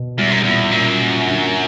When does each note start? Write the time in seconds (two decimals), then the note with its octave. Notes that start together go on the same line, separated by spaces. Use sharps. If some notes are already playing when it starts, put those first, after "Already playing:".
Already playing: B2
0.18 E2 G3
0.31 F#2
0.43 E2 A#2
0.72 F#2 A#2
0.99 A#2
1.26 D3